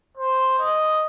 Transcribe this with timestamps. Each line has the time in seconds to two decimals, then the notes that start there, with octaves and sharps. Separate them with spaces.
0.17 C5
0.59 D#5